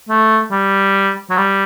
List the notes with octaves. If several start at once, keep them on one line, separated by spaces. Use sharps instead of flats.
A3
G3
F#3
G3